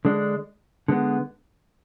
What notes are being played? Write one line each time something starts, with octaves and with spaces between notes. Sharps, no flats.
D3 G#3 D4
D3 G#3 B3